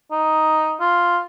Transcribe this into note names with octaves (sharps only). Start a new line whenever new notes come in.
D#4
F4